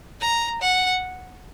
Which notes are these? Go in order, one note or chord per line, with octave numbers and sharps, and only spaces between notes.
A#5
F#5